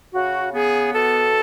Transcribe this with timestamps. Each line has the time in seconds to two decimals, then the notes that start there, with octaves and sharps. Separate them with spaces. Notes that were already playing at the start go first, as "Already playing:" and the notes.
0.13 C#3 F#4
0.54 B3 G#4
0.94 B2 A4